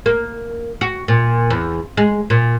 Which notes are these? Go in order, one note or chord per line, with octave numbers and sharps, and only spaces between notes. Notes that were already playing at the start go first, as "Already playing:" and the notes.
A#3
F#4
A#2
E2
G#3
A#2